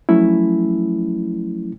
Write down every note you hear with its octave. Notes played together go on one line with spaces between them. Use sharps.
F3 F#3 A3 C#4 E4